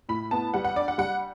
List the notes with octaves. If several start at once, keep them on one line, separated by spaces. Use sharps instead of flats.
A2 B5
B3 A5
G3 F#5
F#5
D4 D5
F#5
G3 F#5